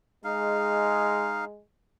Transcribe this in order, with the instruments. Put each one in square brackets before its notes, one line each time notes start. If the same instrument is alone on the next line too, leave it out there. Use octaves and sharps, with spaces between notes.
[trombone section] G#3 [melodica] D#4 F5